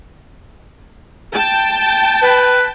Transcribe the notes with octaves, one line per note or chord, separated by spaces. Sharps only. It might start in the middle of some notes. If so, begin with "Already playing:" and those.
G5 A5
B4